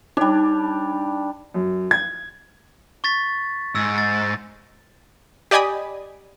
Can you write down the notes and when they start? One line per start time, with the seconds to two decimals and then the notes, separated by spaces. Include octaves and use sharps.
0.17 G3 D4 D#4
1.54 F#2
1.91 G#6
3.04 C#6 A6 B6
3.75 G#2 E6
3.98 A6
5.51 G4 D5 D#5 G#5 B5 D#6